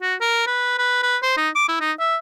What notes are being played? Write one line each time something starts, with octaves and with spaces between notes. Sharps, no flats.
F#4
A#4
B4
B4
B4
C5
D#4
D6
E4
D#4
E5